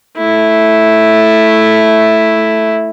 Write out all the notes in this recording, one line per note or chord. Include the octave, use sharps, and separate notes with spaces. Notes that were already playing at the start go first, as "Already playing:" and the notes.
A3 E4